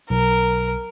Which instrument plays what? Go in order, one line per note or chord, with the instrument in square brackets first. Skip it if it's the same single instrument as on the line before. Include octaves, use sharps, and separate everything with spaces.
[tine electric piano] B1 [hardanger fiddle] A#4